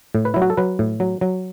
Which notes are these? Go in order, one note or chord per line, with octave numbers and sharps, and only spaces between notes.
A2
B4
F#3 E4
F#4
A4
F#3 B4
A2
F#3
F#3